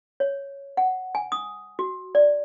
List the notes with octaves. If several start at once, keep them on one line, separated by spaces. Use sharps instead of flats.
C#5
F#5
G#5
D#6
F#4
D5